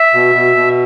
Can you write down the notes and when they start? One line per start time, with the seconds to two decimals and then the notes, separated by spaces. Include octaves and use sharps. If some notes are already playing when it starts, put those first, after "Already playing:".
Already playing: E5
0.14 B2
0.35 B2
0.56 B2